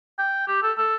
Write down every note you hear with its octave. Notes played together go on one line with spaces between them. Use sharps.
G5
G4
A4
A4